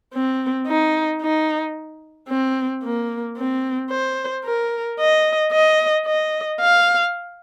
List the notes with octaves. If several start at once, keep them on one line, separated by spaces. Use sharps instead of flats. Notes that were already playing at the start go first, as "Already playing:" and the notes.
C4
D#4
D#4
C4
A#3
C4
C5
A#4
D#5
D#5
D#5
F5